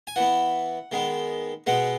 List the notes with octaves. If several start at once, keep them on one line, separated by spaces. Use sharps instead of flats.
G#5
E3 B3 F#5
D#3 G#3 B3
B2 G#3 B3 F#5